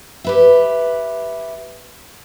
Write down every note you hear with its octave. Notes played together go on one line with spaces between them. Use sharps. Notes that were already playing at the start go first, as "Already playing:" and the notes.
G4 B4 E5